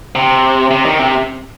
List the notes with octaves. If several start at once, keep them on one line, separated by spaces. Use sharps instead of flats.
C3
C3
D#3
C3